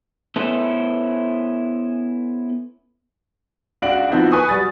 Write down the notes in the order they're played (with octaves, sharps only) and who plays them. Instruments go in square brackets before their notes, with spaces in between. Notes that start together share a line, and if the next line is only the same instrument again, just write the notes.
[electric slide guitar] B3 C#4 E4 A4 C5
[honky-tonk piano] C#2 D4 F#4 F5 D7 F#7
F3 B3 C4 D#4 E4 F#4
B4 G#5 C#6 D#6
F#3 G3 A6